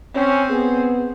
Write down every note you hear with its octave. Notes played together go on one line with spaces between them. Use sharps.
C4 C#4
B3 G#4